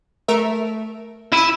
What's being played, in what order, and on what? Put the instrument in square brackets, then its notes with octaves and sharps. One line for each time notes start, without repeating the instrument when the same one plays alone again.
[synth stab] A3 A#4 E5
[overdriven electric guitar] E4 [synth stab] B5 D#7